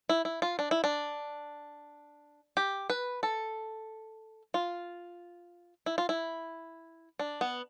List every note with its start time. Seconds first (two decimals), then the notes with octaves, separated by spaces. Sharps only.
0.09 E4
0.25 E4
0.42 F4
0.59 D4
0.71 E4
0.84 D4
2.57 G4
2.90 B4
3.23 A4
4.54 F4
5.86 E4
5.98 F4
6.09 E4
7.19 D4
7.41 B3